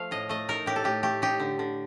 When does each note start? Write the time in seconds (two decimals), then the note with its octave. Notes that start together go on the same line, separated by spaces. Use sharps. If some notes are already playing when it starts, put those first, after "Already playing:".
Already playing: F3 A3 F5
0.11 A2 D#5
0.29 A3 D#5
0.49 D#4 A#4
0.66 A2 G4
0.76 A4
0.84 A2 G4
1.03 A3 G4
1.22 D#4 G4
1.40 D3
1.59 D3